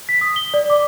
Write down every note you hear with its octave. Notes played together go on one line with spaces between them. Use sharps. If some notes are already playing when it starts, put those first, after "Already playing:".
B6
D#6
G7
D5
D6